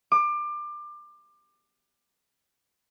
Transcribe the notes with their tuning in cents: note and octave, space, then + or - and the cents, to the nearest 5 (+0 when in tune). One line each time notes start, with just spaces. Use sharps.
D6 +25